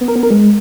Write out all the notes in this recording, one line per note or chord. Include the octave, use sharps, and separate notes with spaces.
B3
A#4
B3
A#4
G#3